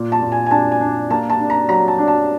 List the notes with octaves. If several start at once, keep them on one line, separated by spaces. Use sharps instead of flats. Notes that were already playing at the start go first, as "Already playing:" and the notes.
Already playing: A#2
A5
A#2
G#5
G#5
D4 A5
G#5
D4
A#3 A5
A5
D4
A#5
F#3 A#5
A5
D4
A5